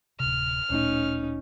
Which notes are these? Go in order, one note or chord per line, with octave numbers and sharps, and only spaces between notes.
D1 C3 F6
D1 A#2 A3 C#4 D#4